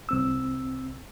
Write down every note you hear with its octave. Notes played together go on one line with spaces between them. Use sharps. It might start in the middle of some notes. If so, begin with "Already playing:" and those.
C2 C4 E6